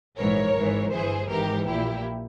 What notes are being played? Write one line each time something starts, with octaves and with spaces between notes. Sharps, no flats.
A#1 G#2 E3 A#4 C#5
G#1 G#2 E3
G1 G2 E3 G#4 C5
G#1 G#2 E3 G4 A#4
A#1 A#2 E4 G4